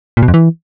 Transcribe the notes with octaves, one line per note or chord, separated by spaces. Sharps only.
A#2
B2
F2
E3